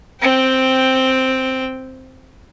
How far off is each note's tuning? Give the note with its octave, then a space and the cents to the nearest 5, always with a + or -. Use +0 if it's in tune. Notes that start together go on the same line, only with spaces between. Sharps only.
C4 +0 G5 +0